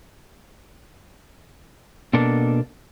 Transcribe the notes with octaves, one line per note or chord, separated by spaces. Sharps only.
B2 A#3 D4 A4